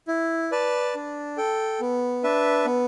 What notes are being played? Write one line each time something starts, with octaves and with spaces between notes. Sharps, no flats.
E4
B4 D5 A5
D4
A4 G5
B3
D4 B4 E5
B3